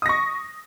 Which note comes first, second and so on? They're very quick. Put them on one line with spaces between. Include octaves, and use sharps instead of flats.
D#6 A#6 C#6